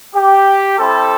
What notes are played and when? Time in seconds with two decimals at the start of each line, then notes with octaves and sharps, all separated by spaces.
0.15 G4
0.78 G3 C4 E4 A4